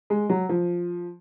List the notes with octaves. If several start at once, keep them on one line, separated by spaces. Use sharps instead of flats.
G#3
F#3
F3